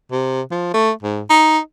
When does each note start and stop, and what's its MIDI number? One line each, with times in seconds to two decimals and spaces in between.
0.11 0.41 48
0.51 0.74 53
0.74 0.91 57
1.03 1.22 44
1.30 1.58 63